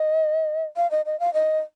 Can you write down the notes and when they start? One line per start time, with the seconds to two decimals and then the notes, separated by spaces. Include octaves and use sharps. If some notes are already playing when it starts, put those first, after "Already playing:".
Already playing: D#5
0.76 F5
0.91 D#5
1.06 D#5
1.20 F5
1.34 D#5